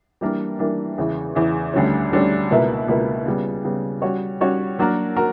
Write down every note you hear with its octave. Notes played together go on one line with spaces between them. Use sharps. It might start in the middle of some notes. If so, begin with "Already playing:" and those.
E3 G3 A#3 D4 A#4
E3 G3 A#3 D4 A#4
E2 C#3 E3
E2 C#3 E3
D2 D3 G3 C#4
D2 D3 G3 C#4
C#2 B2 A#3 E4 B4
C#2 B2 A#3 E4 B4
C#3 G3 B3
C#3 G3 B3
G3 C#4 F#4 C#5
G3 C#4 F#4 C#5
F#3 A#3 D4 F#4 A#4
F#4 A#4